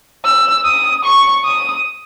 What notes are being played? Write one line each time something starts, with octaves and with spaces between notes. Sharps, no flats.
E6
D#6
C#6
D#6